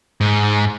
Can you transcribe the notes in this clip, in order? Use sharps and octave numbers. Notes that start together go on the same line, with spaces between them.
G#2